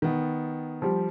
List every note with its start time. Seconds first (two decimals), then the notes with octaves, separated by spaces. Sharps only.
0.02 D#3 B3
0.82 F3 G3